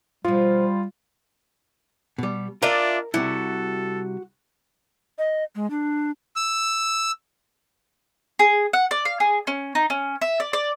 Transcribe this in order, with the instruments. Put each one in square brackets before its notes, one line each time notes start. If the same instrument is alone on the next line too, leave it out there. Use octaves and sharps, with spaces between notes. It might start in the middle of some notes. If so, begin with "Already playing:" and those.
[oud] B2 F3 [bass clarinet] G3 [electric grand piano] F4
[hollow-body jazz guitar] B2 G3
[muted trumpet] D4 [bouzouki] F4 D5 E5 [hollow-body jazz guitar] A#4
[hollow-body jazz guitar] C3 G3 E4 [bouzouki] F#4 [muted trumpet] A4
[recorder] D#5
G#3
D4
[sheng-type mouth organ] E6
[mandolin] G#4
F#5
D5
F5
G#4
C#4
D#4
C#4
E5
D5
D5